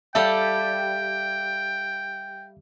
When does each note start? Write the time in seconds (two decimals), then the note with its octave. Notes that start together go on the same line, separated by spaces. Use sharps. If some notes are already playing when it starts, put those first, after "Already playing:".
0.15 G3 G4 A4 E5 F5 G5